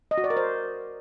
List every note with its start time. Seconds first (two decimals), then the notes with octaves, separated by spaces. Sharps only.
0.11 D#5
0.18 F#4
0.24 D5
0.30 A#4
0.37 C5